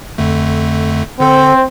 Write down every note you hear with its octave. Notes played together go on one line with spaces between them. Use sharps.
F2 D3 A3
D3 C4 A4 C5